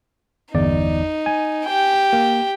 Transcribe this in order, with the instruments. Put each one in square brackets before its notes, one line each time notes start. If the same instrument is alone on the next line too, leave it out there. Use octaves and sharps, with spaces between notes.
[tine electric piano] G1 E2 D5 [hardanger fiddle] D#4
[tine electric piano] G#5
[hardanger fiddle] G4 G5
[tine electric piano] A#3